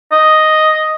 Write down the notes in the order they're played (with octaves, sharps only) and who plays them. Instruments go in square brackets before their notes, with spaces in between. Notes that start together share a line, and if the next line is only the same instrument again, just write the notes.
[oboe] D#5